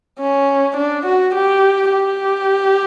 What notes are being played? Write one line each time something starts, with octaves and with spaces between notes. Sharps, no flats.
C#4
D4
F#4
G4
G4